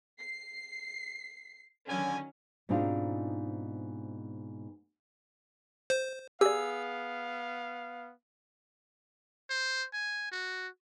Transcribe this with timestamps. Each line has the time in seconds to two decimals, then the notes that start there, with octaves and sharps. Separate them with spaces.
0.19 C7
1.87 D3 D#3 F#3 C#4 G#5
2.69 G#2 B2 C4 D4 D#4 F4
5.90 C5
6.41 B3 G4 G#4 D5 F5 E6
9.49 C5
9.93 G#5
10.32 F#4